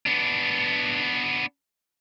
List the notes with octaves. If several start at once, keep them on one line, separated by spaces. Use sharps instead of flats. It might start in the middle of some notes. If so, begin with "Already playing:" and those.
B3 D4